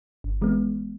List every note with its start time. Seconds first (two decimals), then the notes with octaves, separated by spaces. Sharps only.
0.24 G1
0.42 E3 G#3 B3